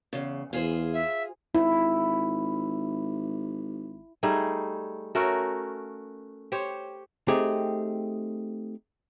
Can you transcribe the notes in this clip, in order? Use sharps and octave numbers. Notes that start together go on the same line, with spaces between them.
E2 C#3
E2 F4 G#4 C5
E5
G#1 E4
G3 A3 D#4 G#4
A3 C#4 F#4 A#4
G4 C5 C#5
A3 C4 D#4 G4 G#4